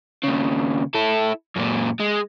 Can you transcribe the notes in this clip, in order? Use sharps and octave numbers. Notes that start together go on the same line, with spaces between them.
D#2 C#3
E4 A4
F#2 A#2
G#3